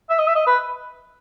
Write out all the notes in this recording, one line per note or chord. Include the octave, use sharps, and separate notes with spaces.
E5
D#5
E5
D#5
B4